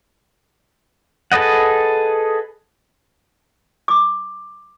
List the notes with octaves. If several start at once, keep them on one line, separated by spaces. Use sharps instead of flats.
G#4 A4 B4 D#5 F#5
D6